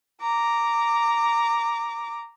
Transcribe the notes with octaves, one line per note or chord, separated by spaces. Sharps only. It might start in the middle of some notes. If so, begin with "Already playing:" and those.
A#5 D6